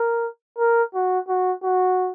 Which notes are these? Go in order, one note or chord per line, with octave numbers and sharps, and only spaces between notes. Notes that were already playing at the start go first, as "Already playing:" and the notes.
Already playing: A#4
A#4
F#4
F#4
F#4